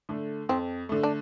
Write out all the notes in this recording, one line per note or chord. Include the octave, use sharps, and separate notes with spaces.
D3 A3
F2 C4
D3 A3
D4